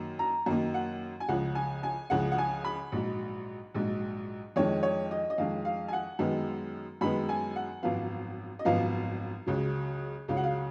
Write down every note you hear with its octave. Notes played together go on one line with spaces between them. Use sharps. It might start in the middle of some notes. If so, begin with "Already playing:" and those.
Already playing: F#2 D#3 A#3
A#5
F#2 D#3 A#3
F#5
G#5
C#2 C#3 F3 F#5
G#5
G#5
C#2 C#3 F3 F#5
F#5
G#5
B5
A#1 G#2 F#3
A#1 G#2 F#3
F2 D#3 G#3 C#5
C#5
D#5
D#5
F2 D#3 G#3 F5
F5
G#5
F#5
F#2 D#3 G#3 B3
F#2 D#3 G#3 B3 B5
G#5
F#5
G#1 F#2 F3 B3 F5
D#5
G#1 F#2 F3 B3 F5
C#2 C#3 F#3
C#2 C#3 F#3 F5
F#5
F5